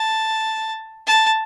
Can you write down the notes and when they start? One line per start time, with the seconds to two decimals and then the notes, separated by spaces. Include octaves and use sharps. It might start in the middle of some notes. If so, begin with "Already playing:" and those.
Already playing: A5
1.07 A5